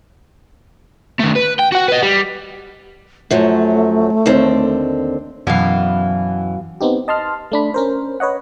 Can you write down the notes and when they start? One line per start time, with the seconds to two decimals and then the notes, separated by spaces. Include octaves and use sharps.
1.20 D#3 A3
1.36 B4
1.60 G5
1.72 F#4 F#5
1.88 B4 D#5
2.02 G3
3.31 F#2 F3 F#3 A3
4.26 D#2 D3 C4
5.47 F#2 B2 E3 B3 F5
6.81 B3 C4 D#4 G4
7.08 D#5 A5 C6 F6
7.52 A3 D4 B5
7.74 C#4 A#4 C5
8.20 B4 C#5 D#5 F#5